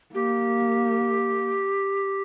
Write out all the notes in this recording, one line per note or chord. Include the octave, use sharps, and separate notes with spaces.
A#3 G4